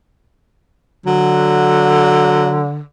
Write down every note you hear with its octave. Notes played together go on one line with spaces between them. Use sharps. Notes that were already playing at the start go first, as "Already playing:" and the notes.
D3 F#3